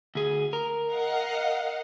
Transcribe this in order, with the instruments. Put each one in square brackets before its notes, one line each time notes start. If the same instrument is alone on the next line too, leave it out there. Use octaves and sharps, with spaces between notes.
[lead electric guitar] D2 G#4
A#4
[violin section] D#5 F5 F#5